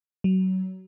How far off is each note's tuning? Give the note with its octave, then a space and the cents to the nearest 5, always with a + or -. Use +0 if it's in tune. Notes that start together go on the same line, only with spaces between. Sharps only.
F#3 +25